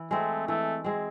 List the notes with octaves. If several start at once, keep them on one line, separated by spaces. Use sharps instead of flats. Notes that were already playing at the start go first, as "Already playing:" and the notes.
Already playing: E3
G#3 A3 C4
E3 A3
G#3 C4